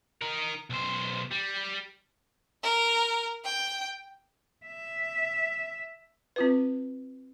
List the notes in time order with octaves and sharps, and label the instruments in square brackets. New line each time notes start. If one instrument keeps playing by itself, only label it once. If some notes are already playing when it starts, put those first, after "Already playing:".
[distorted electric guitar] D#4 A#4
B1 C5
G3
[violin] A#4
G5
[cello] E5
[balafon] C4 F4 B4